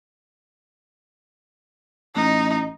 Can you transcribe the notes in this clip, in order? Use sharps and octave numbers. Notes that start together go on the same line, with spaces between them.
A1 D#4